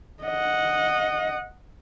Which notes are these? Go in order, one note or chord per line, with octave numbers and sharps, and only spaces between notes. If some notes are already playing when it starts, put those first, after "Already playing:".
D#5 F#5